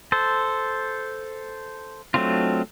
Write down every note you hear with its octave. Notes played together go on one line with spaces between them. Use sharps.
A4 C5
F#3 A3 C4 D4 F4